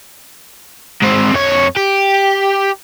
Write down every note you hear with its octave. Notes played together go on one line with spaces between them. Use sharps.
G#2 C4
F2 C#5
G4